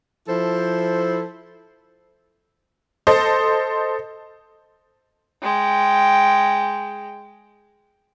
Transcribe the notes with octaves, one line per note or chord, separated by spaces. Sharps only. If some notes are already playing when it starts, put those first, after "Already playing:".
F3 E4 A4 C5
A4 C5 D#5
G#3 G5